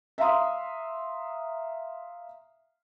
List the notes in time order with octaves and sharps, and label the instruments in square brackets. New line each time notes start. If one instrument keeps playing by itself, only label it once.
[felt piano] E5 F5 A#5 C6 D#6